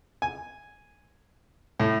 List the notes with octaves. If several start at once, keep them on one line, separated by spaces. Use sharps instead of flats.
G#5
A2